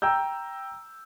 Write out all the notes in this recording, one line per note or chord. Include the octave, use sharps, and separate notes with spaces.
G5 A#5 E6 G6